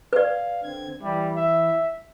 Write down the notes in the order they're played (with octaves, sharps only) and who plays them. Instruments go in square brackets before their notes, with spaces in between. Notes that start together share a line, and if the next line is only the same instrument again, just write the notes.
[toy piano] B4 D5 [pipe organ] F5
[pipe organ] D3 C4 G#6
[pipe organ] E3 E4 [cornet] G3
[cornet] E5